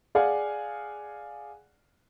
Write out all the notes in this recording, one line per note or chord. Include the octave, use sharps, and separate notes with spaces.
G#4 D5 F5 F#5 G#5